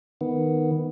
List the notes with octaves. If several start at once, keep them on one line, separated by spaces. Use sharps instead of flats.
D#3 B3